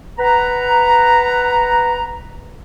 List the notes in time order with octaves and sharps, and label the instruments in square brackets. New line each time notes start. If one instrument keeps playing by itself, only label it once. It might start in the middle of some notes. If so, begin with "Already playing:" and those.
[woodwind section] B4 F#5 A#5